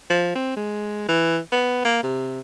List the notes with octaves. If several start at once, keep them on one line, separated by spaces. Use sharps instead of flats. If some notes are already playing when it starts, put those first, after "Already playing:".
F3
C4
G#3
E3
B3
A#3
C3